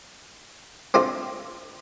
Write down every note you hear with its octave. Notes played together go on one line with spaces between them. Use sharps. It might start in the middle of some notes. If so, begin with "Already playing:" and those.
C4 D4 F4 A4 D5